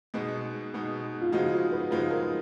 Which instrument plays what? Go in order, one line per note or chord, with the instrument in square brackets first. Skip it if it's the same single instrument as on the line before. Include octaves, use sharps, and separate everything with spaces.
[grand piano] B2 G#3 B3 D#4
B2 G#3 B3 D#4
[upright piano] F4
[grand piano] C#3 F3 G#3 D#4 [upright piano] F#4
[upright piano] B4
[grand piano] C#3 F3 G#3 D#4 [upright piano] B4
[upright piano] A#4